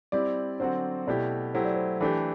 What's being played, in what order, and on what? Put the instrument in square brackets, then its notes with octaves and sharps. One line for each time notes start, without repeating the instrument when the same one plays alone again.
[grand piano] G3 C4 E4 G4 [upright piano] D5
[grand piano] D3 F#3 C4 F#4 [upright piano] C5
[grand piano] B2 A3 E4 G4 [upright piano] D5
[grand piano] F#3 A3 E4 G4 [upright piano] C5
[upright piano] D5
C5
[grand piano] E3 A3 D4 G4 [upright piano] A4